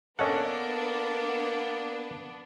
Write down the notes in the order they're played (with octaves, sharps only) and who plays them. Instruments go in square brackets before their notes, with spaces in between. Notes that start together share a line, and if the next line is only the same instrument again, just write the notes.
[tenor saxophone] A#3 [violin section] B3 D4 [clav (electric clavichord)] C#4 C#5 F#5 [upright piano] A4 D#5